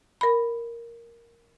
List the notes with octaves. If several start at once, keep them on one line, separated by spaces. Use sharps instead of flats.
A#4 B5